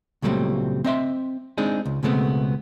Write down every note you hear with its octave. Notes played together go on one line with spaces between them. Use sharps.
C#2 A#2 F#3 G3 A3 C4
C4 D#5 E5 C6
G#3 C4 D4 D#4 G#4
C#2
C#2 B2 G#3 A3 B3 C4